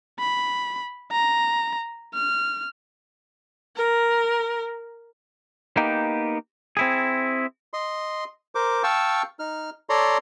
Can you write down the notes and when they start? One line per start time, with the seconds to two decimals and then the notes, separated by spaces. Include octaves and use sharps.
0.19 B5
1.12 A#5
2.14 F6
3.76 A#4
5.77 A#3 B3 D#4 G4
6.77 C4 E4 G#4
7.73 D#5 C6
8.55 A#4 C5 D6
8.83 F5 G5 A5 C#6 E6
9.39 D#4 F6
9.89 A4 C#5 D5 A#5 C6